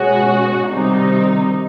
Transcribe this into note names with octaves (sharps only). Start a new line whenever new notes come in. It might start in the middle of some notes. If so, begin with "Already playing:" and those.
Already playing: B2 G#3 C#4 F#4
C3 D#3 G3 C4 D#4